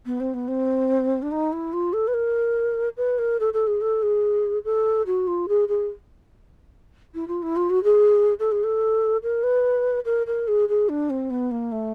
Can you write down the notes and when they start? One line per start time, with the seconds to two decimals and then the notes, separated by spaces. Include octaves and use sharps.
0.06 B3
0.20 C4
0.34 B3
0.48 C4
1.22 D4
1.32 D#4
1.53 E4
1.73 F4
1.93 A4
2.08 B4
2.14 A#4
2.97 B4
3.19 A#4
3.40 A4
3.54 A4
3.67 G#4
3.81 A4
4.03 G#4
4.65 A4
5.06 F#4
5.27 F4
5.48 G#4
5.68 G#4
7.15 E4
7.28 F4
7.43 E4
7.56 F4
7.70 F#4
7.84 G#4
8.39 A4
8.52 G#4
8.64 A4
9.23 A#4
9.43 B4
10.05 A#4
10.27 A#4
10.48 G#4
10.69 G#4
10.89 D4
11.10 C4
11.30 B3
11.51 A#3
11.72 A3